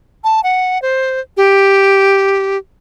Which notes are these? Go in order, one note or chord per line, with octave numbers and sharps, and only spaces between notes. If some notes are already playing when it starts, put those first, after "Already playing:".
A5
F#5
C5
G4